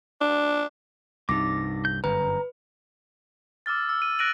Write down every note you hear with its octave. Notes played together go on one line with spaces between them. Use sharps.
D4
C2 G2 D#4 D6 A#6
G6
G1 F#2 B4 A#5
D6 E6 F6 A6
E6
D#7
F#6 A#6 D7 D#7 F#7